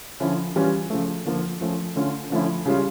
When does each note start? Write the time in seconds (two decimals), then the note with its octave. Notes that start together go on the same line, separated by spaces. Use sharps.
0.20 D3 F3 C#4 E4
0.56 E3 G3 C#4 F4
0.90 C#3 F3 A3
1.25 D3 F3 A#3
1.61 F3 A3 C#4
1.96 D3 A3 C#4 F4
2.30 D3 F3 A3 C#4 E4
2.66 C#3 G3 C#4 F4